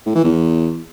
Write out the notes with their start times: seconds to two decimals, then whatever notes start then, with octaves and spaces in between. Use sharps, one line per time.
0.06 A2
0.15 E3
0.24 E2